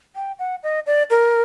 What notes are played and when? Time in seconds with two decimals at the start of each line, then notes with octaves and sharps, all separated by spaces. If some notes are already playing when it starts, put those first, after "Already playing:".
0.15 G5
0.39 F#5
0.63 D#5
0.87 D5
1.10 A#4